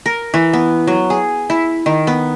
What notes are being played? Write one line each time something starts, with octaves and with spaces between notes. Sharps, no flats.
A#4
E3
B3
F#3
G#4
E4
D#3
B3